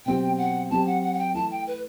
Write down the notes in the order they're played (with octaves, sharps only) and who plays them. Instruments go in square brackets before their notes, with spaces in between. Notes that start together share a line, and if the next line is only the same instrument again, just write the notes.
[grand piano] B2 F#3 C4 G4 [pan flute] G5
[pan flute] F#5
[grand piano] F#3 C4 G4 [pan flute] A5
[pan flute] F#5
F#5
F#5
G5
[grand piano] E3 A3 E4 [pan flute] A5
[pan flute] G5
B4